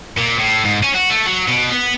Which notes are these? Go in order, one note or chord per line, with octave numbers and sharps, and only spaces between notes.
A#2
A2
G#2
C#4
F#4
A3
F#3
B2
B3